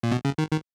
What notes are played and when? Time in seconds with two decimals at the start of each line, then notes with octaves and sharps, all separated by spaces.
0.03 A#2
0.12 B2
0.25 C#3
0.38 D#3
0.51 D#3